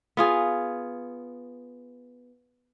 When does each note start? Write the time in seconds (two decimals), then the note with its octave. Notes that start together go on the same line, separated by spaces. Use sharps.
0.17 B3 F4 G#4